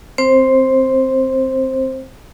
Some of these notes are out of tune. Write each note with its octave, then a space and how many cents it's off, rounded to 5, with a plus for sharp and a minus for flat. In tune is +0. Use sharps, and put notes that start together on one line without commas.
C4 +0 C5 +15